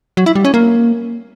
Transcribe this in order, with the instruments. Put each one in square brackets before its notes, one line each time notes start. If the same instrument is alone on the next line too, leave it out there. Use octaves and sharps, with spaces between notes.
[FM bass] F#3
E4
G3
C#4
A#3